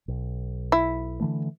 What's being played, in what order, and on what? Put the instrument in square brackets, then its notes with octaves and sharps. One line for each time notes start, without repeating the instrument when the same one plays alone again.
[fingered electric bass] B1
[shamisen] E4
[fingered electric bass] D3 E3 A3